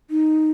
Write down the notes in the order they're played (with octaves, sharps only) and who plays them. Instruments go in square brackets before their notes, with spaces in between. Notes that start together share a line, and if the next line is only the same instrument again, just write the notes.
[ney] D#4